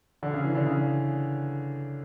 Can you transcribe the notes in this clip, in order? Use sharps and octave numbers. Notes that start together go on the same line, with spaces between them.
D3
C#3
E3
D3
C#3